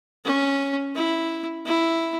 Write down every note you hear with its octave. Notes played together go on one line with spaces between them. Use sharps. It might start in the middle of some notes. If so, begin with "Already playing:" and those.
C#4
E4
E4